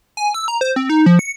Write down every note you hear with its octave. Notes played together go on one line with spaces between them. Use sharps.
G#5
E6
A#5
C5
C4
D#4
F3
C#7